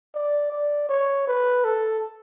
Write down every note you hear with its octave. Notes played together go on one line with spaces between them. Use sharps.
D5
D5
C#5
B4
A4